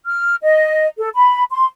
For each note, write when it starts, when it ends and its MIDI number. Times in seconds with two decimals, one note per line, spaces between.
0.06 0.35 89
0.42 0.86 75
0.98 1.09 69
1.15 1.43 83
1.51 1.65 84